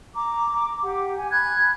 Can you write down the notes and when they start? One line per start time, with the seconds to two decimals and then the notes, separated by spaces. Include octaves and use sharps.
0.15 A#5 D6
0.83 G4 F#5
1.16 G#5
1.31 B5 F#6 G#6